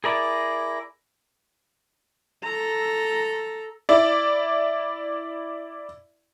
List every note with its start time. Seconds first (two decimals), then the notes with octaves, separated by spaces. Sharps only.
0.04 E4 G#4 A#4 D5
2.44 A4 A#5
3.89 E4 D5